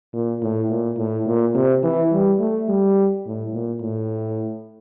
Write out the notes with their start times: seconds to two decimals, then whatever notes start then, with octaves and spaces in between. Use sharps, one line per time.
0.13 A#2
0.42 A2
0.70 A#2
0.98 A2
1.26 A#2
1.55 C3
1.83 E3
2.12 G3
2.40 A3
2.69 G3
3.26 A2
3.54 A#2
3.81 A2